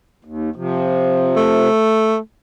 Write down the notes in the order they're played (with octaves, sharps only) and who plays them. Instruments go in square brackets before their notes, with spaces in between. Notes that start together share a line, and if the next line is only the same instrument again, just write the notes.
[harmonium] D#2
C3 F3
[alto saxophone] A3